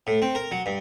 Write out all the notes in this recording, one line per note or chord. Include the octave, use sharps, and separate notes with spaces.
A2
C4
A#4
F#3
G2